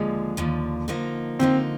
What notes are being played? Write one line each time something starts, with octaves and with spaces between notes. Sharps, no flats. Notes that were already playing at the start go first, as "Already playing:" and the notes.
Already playing: D#2 D3 F3 G#3
D#2 D3 F3
D3 F3 A#3 D#4
D3 F3 A#3 C4 D#4